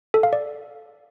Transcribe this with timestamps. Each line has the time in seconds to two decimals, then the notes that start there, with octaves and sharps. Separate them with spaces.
0.14 A4
0.23 F5
0.33 D5